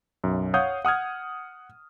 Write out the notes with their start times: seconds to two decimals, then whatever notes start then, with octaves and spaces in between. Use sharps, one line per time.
0.24 B1 F#2
0.54 C#5 F5 F#5 D#6 G6
0.85 F#5 D#6 F6 G#6